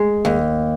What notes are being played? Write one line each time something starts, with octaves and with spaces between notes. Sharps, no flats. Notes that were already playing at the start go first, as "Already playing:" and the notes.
Already playing: G#3
D#2